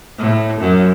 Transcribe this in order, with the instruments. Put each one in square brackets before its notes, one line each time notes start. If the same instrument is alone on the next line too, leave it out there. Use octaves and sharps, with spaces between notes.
[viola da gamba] A2
F#2